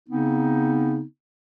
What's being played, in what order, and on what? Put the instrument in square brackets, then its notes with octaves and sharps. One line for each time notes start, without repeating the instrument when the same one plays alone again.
[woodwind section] C#3 B3 C4 D#4